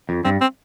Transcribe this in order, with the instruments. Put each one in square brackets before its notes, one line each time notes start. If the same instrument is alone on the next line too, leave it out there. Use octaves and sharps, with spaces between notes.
[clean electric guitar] F2
[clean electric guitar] G2 [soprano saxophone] C4
[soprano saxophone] C4